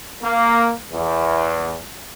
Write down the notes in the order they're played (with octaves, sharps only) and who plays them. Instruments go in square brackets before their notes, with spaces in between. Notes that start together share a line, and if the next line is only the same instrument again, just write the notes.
[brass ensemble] A#3
E2